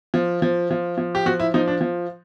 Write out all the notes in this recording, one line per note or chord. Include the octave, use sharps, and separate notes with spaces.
F3
F3
F3
F3
G4
F3 F#4
E4
F3 D#4
D4
F3